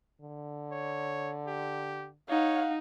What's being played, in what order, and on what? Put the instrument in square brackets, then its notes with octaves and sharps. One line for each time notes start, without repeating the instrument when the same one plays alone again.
[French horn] D3
[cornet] C#5
G4
[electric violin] D#4 [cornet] C#5 [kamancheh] F5 F#5